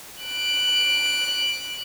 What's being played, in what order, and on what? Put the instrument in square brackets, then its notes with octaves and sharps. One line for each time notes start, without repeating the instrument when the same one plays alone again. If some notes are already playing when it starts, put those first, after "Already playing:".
[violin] F#6 D7